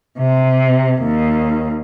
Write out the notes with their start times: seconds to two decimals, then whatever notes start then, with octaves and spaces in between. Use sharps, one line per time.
0.18 C3
1.02 D#2